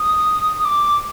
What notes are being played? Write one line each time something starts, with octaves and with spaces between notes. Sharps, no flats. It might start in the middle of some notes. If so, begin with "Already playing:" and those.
Already playing: D#6
D#6
D6